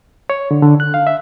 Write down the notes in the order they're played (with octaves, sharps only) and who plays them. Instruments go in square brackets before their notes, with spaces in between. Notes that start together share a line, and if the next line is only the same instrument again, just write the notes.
[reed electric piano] C#5
D3
D3
F#6
F5
E5